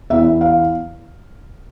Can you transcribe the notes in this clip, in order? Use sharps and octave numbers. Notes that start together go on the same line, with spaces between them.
E2 E3 E5
F5